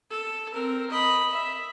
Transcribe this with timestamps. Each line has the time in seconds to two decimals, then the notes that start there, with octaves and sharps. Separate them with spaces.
0.10 A4
0.53 C4 A#4
0.90 D#5 B5
1.32 E5